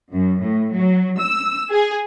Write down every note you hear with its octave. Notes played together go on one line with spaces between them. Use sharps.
F#2
A2
F#3
E6
G#4